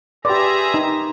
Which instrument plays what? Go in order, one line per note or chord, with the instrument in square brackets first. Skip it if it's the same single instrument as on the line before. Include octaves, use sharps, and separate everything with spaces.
[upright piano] G4 B4 [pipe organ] G#4 E5 A#5 [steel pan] D5 [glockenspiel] C6 D6
[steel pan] D#4